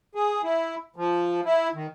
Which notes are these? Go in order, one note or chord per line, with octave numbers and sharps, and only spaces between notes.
G#4
E4
F3
E4
D#3